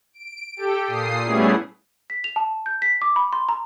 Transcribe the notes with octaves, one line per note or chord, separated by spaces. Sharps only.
D7
G4 A4 G5
A#2 D#6 C7
G3 A3 B3 C#4 E4 G#4
B6
F7
A5
G6
B6
D6
B5
C6
A#5